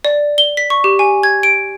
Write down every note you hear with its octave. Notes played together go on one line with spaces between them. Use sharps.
D5
G7
B6
C#6
G4
G#5
G#6
D7